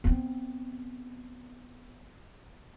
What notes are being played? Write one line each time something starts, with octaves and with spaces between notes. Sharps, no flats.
B3 C4